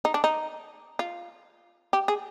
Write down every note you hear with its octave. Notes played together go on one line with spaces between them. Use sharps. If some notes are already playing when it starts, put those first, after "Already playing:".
D#4
D4
D#4
F4
G4
G#4